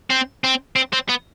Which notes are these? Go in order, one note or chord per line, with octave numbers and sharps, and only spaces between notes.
C4
C4
C4
C4
B3